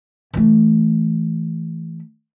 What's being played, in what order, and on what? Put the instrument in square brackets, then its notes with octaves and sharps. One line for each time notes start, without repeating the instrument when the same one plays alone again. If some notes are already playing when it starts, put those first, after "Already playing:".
[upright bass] E3 A3